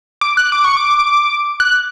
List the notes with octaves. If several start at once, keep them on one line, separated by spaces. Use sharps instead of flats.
D6
F#6
D6
C#6
D6
F#6